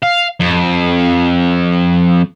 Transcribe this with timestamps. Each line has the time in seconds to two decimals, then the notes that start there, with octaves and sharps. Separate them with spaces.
0.03 F5
0.40 F2